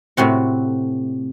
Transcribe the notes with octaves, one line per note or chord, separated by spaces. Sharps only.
A2 C3 C4 F#4